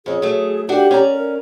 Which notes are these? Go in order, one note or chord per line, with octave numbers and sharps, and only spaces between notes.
F2 C#4 G#4
F#3 A3
D4 F#4 G4 F#5
C#4 D5 A#5
A#4